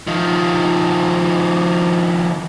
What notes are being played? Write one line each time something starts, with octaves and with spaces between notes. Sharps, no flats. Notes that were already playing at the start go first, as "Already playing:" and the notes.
D#3 F3